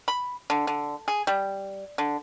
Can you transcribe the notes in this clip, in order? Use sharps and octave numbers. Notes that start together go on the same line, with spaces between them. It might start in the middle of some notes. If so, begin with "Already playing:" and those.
B5
D3
D3
G#4
G3
D3